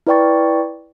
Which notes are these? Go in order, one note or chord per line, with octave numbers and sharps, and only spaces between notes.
E4 B4 D5 G5 C#6 A6